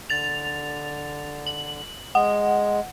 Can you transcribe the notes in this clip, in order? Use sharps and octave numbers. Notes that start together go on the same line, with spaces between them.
D3 A6 F7
F#7
G#3 F#5